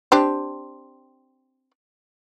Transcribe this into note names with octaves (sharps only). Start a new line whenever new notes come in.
C4 D4 G4